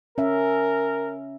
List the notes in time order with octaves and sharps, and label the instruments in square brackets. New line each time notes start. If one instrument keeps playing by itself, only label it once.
[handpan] C#4 E5 [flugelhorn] A#4